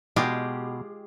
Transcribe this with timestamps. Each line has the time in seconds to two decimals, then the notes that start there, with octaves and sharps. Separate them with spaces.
0.16 B2 G#3 F4 G4